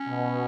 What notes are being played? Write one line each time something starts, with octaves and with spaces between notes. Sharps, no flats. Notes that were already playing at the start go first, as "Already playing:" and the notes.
Already playing: C#4
B2